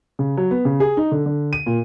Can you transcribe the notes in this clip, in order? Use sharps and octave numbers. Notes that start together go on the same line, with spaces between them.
C#3
F#3
B3
C#3
G#4
D#4
D3
D3
D#7
A#2